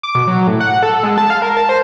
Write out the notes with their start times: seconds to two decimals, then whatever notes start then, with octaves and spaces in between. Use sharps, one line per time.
0.03 D6
0.15 B2
0.27 F#3
0.48 A2
0.60 F#5
0.83 A4
1.03 G#3
1.18 A5
1.30 F5
1.42 A#4
1.57 A5
1.69 C5